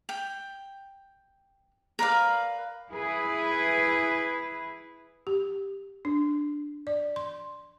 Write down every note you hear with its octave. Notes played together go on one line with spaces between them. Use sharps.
G5
A#4 B4 D5 F5
E4 G#4 B4
G4
D4
D5
C6